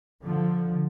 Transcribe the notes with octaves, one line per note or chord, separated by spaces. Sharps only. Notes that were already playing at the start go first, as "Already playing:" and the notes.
D3 F3